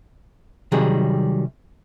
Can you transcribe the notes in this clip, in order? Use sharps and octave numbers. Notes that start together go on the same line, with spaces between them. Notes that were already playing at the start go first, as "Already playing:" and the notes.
C3 D#3 F#3 G3 G#4